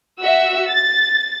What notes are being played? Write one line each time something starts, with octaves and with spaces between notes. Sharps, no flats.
F#4 E5 E6
A6